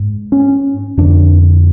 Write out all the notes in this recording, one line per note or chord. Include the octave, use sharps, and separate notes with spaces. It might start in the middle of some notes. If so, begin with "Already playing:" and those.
Already playing: G#2
C#4
F2 D3 D4